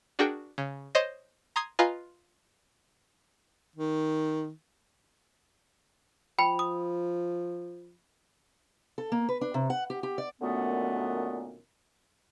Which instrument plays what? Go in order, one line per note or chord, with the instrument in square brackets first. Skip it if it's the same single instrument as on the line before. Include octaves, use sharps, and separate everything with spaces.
[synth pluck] D4 F#4 G#4 A#4 G5 C#6
C#3
C5 C#5 D#5
A#5 C6 D#6 G#6 C7
F4 B4 D#5 F5 G#5 A#5
[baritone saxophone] D#3
[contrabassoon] F3 [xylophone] G5 [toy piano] B5
[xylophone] D#6
[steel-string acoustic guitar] A4
A#3
B4
D4
C3
F#5
G4
G4
D5
[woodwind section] F#2 A#2 D3 D#3 A3 B3